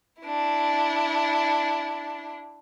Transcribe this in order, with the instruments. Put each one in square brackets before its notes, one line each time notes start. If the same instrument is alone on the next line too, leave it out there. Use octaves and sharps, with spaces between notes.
[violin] D4 E4